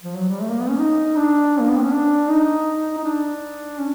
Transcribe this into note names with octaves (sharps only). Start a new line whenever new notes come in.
F3
F#3
G3
A3
A#3
B3
C#4
D#4
D4
A#3
B3
C4
C#4
D4
D#4
D#4
D4
C#4